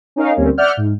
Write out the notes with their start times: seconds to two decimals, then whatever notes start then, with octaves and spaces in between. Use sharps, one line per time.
0.16 C#4 D#4 A#4 F5
0.36 D2 G3 A#3 C4 C#4
0.58 D5 E5 F#5 F6 G6
0.77 G#2